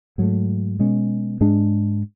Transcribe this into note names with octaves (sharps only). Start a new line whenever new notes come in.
G#2 F#3 A3
B2 G#3 C#4
G#2 G#3 D4